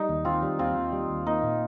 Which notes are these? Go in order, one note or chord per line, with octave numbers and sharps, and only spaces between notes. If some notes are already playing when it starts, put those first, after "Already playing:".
Already playing: G3 D#4
D#2
D#3 C4 F4
G3
D#2 C4 F4
D#2
G3
D#2
A#3 D#4
A#2